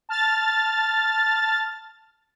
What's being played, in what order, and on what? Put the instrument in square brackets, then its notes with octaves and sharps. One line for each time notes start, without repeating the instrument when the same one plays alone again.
[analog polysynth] A5 F6 A6